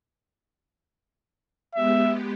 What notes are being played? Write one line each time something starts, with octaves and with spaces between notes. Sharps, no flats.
G#3 B3 G4 E5